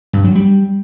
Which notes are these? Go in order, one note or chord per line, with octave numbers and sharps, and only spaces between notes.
G2
F#3
G3